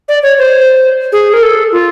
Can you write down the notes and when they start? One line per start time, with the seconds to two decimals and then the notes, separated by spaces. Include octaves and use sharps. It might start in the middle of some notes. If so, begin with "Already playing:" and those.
0.09 D5
0.23 C#5
0.38 C5
1.12 G#4
1.33 A#4
1.43 A4
1.72 F4